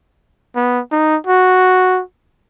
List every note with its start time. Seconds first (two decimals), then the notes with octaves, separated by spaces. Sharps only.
0.55 B3
0.92 D#4
1.27 F#4